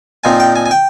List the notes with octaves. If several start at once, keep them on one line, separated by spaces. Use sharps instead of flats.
A#2 F3 C4 D#4 G#5
G5
G#5
G#5
G5